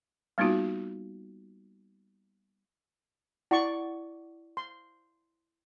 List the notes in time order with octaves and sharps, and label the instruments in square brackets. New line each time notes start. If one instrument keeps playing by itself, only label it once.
[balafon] G3 A#3 B3 D#4 F4 F#4
[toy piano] E4 F#5 [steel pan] D5 C#6
[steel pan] C6